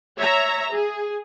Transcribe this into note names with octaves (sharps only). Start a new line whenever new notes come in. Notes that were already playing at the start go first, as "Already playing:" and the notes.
C#5 E5 A#5
G#4